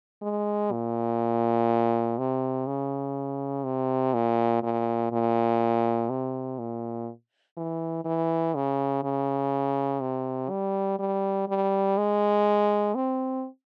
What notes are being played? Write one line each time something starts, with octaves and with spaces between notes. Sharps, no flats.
G#3
A#2
C3
C#3
C3
A#2
A#2
A#2
C3
A#2
E3
E3
C#3
C#3
C3
G3
G3
G3
G#3
C4